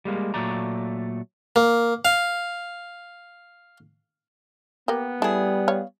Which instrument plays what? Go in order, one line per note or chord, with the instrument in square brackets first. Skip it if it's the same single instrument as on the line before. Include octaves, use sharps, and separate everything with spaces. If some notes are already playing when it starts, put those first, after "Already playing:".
[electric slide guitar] G3 G#3 A#3
A#2 F#3 A3 D5 A#5
[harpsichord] A#3
F5
[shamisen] A#3 G4 [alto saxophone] B3
[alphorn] G3 [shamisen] A3 [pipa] E4 G#4
[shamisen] C#5 F5